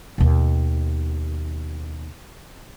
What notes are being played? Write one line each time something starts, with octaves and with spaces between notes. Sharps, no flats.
D#2 B2